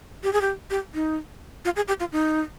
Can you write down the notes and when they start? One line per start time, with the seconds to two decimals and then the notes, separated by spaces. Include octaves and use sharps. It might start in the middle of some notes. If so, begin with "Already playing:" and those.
0.23 G4
0.33 G#4
0.41 G4
0.70 G4
0.94 D#4
1.65 F4
1.76 G#4
1.88 G4
2.00 F4
2.12 D#4